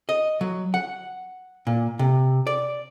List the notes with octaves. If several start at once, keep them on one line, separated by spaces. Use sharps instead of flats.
D#5
F#3
F#5
A#2
C3
D5